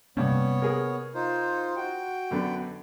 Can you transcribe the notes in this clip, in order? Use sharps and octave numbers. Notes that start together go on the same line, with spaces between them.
G2 C3 A#3 B3 C#4 C#5
G#4 A#4
D#4 F4 C5
F#4 G5
F#2 D3 B3